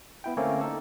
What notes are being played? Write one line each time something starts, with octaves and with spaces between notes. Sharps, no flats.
B3 E4 G5
D3 A3 A#3 C4 C#4
D#4 A4